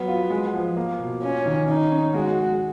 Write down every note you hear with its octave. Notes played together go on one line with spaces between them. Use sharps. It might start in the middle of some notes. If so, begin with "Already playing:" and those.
Already playing: F#3 B3
F4
G#3
F3
A#3
B2
C#4 F4
D#3
C#4 D#4
C#4
G#3 F#4
G#3